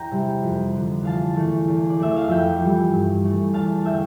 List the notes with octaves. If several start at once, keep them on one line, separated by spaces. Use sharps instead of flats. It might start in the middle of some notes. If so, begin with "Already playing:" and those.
Already playing: E2 G5 A#5
C3 G3
F2
D3 F3
E2 F5 A5
E3 A3
E2
D5
E3 A3 E5
F5
F2 E5 G5
E3 G3
G2
E3 A3
E2 F5 A5
D3 A3 E5 G5